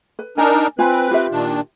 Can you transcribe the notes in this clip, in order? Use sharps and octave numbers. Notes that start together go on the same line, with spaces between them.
B4
D4 D#4 A#4 G#5
C4 F4 B4 G#5
F4 G4 E5
A#2 D#3 D4